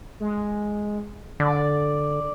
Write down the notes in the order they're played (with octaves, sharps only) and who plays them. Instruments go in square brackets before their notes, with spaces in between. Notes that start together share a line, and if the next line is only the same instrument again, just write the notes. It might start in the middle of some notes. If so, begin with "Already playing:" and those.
[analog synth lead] G#3
[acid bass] D3 [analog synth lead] D5